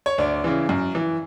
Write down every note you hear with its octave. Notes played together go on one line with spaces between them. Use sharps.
C#5
D2 D5
C#3 E3
F#2
E3